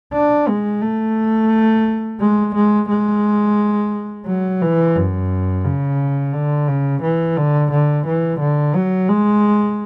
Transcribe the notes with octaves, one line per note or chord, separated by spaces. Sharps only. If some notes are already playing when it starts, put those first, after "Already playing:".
D4
G#3
A3
G#3
G#3
G#3
F#3
E3
F#2
C#3
D3
C#3
E3
D3
D3
E3
D3
F#3
G#3